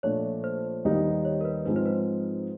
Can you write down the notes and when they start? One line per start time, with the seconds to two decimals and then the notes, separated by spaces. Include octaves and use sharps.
0.03 A#2 F3 A3 D4 C#5
0.44 C5
0.85 D#2 D#3 G3 B3 D#4
1.25 C#5
1.41 A#4
1.45 B4
1.65 G#2 F3 G#3 C4 D#4 B4
1.76 C5
1.86 B4